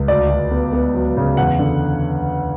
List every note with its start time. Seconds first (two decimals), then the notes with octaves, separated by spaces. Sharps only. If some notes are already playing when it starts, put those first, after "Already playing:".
Already playing: C#2
0.08 D2 D5
0.29 D2
0.51 B3
0.73 B3
0.94 F#3
1.17 C#3
1.37 E2 F#5
1.59 D3